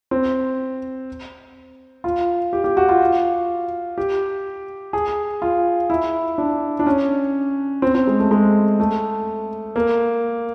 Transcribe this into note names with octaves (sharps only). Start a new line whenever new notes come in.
C4
F4
G4
G4
F#4
F4
G4
G#4
F4
E4
D4
D4
C#4
C4
C4
G#3
A3
G#3
A3
A#3